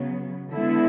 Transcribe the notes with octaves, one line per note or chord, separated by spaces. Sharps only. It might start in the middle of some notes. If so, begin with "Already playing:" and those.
Already playing: C#3 F#3 B3
D3 G#3 B3 E4